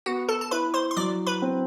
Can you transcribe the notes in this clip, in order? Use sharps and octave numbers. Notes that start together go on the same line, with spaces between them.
B3 F#4 F#5
A4 A5
A5
E4 B4 B5
C5 C6
C6
F#3 D5 D6
B4 B5
C4